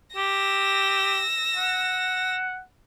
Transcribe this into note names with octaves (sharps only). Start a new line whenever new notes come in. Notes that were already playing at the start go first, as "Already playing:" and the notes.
G4 E6 A#6
F#5